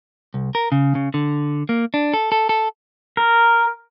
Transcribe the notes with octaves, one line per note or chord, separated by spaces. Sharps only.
C2
A#4
C#3
C#3
D3
A#3
D4
A4
A4
A4
A#4